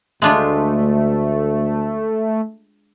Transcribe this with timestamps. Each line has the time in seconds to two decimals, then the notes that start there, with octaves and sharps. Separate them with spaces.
0.22 D2 G#3 A3 D4 F4